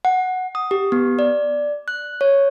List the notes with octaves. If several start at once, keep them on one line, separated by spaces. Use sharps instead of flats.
F#5
D#6
G4
B3
D5
F#6
C#5